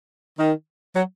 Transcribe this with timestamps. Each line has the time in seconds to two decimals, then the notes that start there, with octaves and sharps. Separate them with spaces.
0.40 D#3
0.96 F#3